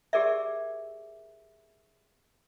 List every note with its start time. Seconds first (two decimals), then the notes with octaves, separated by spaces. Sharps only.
0.13 G4 G#4 A#4 D5 E5